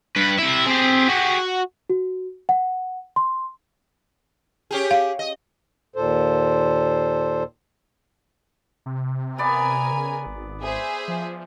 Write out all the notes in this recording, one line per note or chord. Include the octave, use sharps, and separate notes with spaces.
G2 B4
C3 E4 E5
C4 G4 G#4
F#4
F#4
F#5
C6
C#4 G4 G#4
F5
D#5
D#2 A#2 A4 C5
C3
B3 A#4 D5 G#5
C#3
G#1
G#4 C5 E5
F3